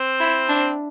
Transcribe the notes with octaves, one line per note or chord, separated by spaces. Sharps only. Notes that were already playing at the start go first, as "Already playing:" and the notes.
Already playing: C4
E4
D4